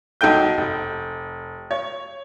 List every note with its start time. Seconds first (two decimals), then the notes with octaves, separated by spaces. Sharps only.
0.21 B1 D#4 A4 G5 G6
0.58 F1
1.71 C#5